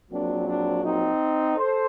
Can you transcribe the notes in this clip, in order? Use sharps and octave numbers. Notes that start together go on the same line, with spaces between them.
A#1 A#2 F#3 C4 D4
D4
C4 D#4
A4 C5